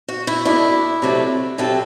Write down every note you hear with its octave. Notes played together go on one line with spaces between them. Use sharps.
F#4
E4
B2 A3 D4 E4
C3 F#3 A3 D4
C3 F#3 C4 A4